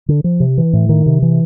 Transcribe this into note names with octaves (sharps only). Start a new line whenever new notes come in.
D3
F3
C3
E3
A2
D#3
C3
E3